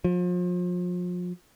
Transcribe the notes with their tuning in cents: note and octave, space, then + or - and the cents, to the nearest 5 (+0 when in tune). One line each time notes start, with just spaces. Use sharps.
F3 +35